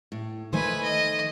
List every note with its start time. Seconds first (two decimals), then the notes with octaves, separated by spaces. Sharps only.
0.12 A2
0.53 D#3 F3 A3 D#4 B4 C5 G#5
0.83 D#5